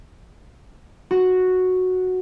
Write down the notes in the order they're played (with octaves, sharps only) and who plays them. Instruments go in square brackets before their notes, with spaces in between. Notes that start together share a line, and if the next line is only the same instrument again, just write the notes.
[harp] F#4